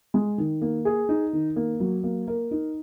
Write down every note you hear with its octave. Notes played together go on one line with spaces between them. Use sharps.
G#3
D#3
A#3
G#4
D#4
D#3
A#3
F#3
A#3
A#4
D#4